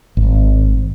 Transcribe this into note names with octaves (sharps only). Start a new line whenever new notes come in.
G#1